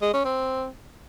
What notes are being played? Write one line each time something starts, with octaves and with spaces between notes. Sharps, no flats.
G#3
C#4
C4